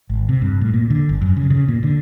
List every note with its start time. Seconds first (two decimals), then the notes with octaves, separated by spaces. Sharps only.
0.10 G#1
0.29 C3
0.42 G2
0.61 A2
0.74 A#2
0.90 D3
1.09 G1
1.22 F#2
1.37 C#3
1.50 C#3
1.68 A#2
1.83 D3